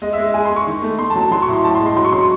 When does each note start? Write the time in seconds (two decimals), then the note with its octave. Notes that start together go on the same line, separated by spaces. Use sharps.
0.02 G#3 D#5
0.13 E5
0.18 G#3
0.34 G#3 G#5
0.45 C6
0.50 G#3
0.56 C#6
0.67 D#3
0.82 A3
0.99 A3 C6
1.10 A5
1.16 F#3
1.21 A5
1.31 F#3 C6
1.42 C#6
1.48 A2
1.53 C6
1.64 A2 A5
1.75 C6
1.80 G#3
1.86 C6
1.97 F#3 C6
2.05 C#6
2.12 F#3 C6
2.21 C#6